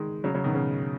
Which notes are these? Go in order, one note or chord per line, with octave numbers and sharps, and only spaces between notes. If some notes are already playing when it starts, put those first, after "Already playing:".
Already playing: D#3 G#3
C#3 F#3
C#3 F#3
B2 D#3
C#3